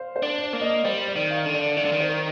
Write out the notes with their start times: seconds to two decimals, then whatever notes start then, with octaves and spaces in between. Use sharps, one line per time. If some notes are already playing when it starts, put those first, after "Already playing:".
Already playing: C5 F5
0.16 C5
0.23 D4
0.38 D5
0.53 A#3
0.61 D#5
0.85 G3 C5
1.08 D5
1.16 D#3
1.30 F5
1.46 D3
1.54 D5
1.77 D#3 D5
1.85 D3
1.92 D#3
2.00 C5